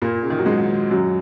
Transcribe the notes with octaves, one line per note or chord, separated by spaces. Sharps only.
A#2 A#3
C#3
D#3
F#3
G#2 G#3
F#2 F#3